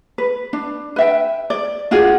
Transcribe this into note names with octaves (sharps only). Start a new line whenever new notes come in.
B4
D4
B4 E5 G5
D5
D4 F4 F#4 G#4